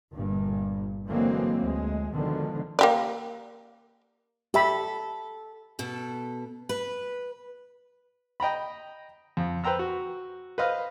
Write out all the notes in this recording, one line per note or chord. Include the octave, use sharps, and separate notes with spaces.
G1 G2 A#2
D3 E3 F#3 G#3 A#3 C4
D2 G#3
B2 D3 D#3 F3 G#3
A#3 G4 D5
G4 A4 E5 B5
B2 A4
B4
D#5 G5 A#5 B5
F2
B4 C5 G5 A#5 E6
F#4
B4 C5 D#5 F5